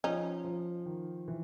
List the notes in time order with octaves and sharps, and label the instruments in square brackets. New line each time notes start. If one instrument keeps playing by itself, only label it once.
[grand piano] F3 [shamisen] C#4 D#4
[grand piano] F3
D#3
E3